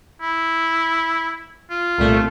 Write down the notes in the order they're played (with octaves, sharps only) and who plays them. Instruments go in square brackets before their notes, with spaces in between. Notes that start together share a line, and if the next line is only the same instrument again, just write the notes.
[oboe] E4
F4
[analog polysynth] C2 A#2 A3